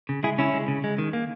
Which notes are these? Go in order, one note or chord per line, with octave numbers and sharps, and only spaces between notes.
C#3
G#3 E4 G#4
C#3 C#4 E4
G#3
C#3
G#3
D#3
A#3